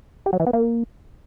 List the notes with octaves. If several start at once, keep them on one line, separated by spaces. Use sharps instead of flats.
G4
F#3
E3
B3
A#3